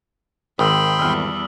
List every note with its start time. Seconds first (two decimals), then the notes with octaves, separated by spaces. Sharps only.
0.59 G#1 D#3 G5 B5 C6 D#6 E6 F#7
1.00 E2 G3 E6 F6